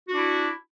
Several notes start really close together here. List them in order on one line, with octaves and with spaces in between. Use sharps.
F#4 D4 E4